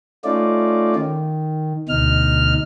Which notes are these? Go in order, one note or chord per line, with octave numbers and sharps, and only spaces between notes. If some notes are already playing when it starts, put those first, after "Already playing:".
A3 C#4 D#4 F4 D5
D#3
D2 B2 D#4 F6